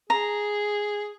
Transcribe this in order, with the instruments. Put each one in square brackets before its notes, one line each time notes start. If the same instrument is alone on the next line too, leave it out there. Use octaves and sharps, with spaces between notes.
[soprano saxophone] G#4 [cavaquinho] A#5